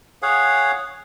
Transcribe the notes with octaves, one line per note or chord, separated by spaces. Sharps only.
G#4 C#5 F5 F#5